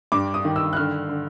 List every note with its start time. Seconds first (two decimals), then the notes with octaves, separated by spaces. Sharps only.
0.12 G2 D6
0.34 D#6
0.45 D#3
0.56 E6
0.73 F#6
0.77 D3 F6
1.09 D3